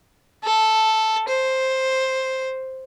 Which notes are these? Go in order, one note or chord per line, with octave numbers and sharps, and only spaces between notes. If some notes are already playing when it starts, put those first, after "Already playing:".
A4
C5